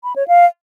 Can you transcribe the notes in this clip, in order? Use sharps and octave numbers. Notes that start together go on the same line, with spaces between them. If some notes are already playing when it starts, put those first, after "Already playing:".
B5
C#5
F5